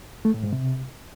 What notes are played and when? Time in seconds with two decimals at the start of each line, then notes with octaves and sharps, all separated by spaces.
0.25 A3
0.34 A2
0.43 G#2
0.52 C3